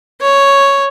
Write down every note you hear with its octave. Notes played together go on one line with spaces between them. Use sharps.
C#5